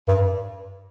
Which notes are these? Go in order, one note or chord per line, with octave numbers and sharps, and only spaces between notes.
G2